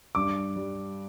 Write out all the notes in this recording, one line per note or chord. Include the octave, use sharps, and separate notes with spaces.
G2 D6
G3